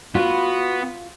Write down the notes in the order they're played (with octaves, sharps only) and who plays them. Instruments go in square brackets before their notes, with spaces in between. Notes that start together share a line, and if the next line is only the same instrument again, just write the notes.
[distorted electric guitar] B3 B4 [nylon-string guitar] F4 [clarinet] F#4